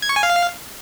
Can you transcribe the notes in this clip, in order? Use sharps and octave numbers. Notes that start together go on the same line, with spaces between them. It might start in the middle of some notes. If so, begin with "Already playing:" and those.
G#6
C#6
G#5
F5